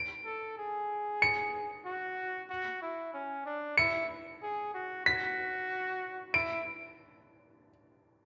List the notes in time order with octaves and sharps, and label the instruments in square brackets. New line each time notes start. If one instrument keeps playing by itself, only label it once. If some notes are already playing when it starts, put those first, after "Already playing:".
Already playing: [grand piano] D7
[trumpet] A4
G#4
[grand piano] C#7
[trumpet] F#4
F#4
E4
C#4
D4
[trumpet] E4 [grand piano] C#7
[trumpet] G#4
F#4
[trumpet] F#4 [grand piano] B6
[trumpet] E4 [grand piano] D7